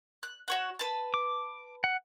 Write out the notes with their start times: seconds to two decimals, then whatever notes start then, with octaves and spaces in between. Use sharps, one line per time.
0.23 F#6
0.48 F#4 C#5 F#5
0.79 B4 A5
1.14 D6
1.84 F#5